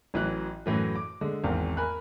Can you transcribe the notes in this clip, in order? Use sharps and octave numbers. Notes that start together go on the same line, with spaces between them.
A1 E3 F#3 F#6
F#2 A2 E3 F#3
D6
D3 G#3
G#1 E2 C4 A#4
A#4 G#5 B5 F#6